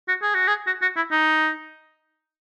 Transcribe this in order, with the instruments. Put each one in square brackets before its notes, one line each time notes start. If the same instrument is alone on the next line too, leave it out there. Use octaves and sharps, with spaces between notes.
[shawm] F#4
G#4
F#4
G#4
F#4
F#4
E4
D#4